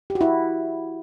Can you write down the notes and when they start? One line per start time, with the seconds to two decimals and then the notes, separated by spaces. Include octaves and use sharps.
0.10 G4
0.15 F#4
0.21 E4